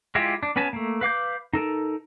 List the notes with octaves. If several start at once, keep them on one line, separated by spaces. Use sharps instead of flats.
G#3 E4 F4 G4
D4
B3 C#4 B4 G#5 A5
A3 A#3
B4 F5 D6 G6
D#4 A4 A#4